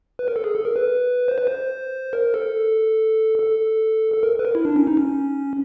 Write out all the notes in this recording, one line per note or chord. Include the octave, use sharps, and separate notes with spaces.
B4
A#4
A4
G#4
A4
A#4
B4
C5
B4
C5
A#4
A4
A4
A4
A#4
B4
A#4
E4
D4
C#4
D#4
C#4